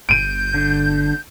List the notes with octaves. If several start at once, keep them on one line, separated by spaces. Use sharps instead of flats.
G1 G6 D7 D#7
D3